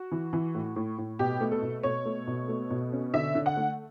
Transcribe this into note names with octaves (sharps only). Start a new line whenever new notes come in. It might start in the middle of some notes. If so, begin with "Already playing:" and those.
Already playing: F#4
E3
E3
A2
A2
A2
B2 G4
A3
A4
B2
B2 C#5
A3
B2
A3
B2
C#4
D3 E5
D3
F#5
A3